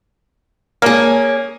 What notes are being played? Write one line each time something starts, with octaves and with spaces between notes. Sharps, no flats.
A#3 C#4 G#4